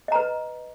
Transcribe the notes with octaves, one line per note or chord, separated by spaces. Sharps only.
B4 D#5 A#5